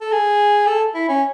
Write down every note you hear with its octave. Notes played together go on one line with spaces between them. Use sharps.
A4
G#4
A4
E4
C#4